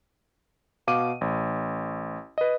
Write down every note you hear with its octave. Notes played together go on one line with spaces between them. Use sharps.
B2 F5 D6 D#7
A1
B4 D#5